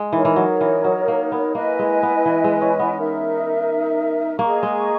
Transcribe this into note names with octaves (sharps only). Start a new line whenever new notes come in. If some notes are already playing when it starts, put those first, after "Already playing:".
Already playing: G#3
E3 D#4 A#4 C#5
E3
F#3
E3
F#3
A#3
B3
A#3 E4 B4 D#5 G#5
G#3
B3
E3
G#3
C#4
B3
D#4 A#4 E5
A#3 G#4 D#5 A#5 C#6
G#3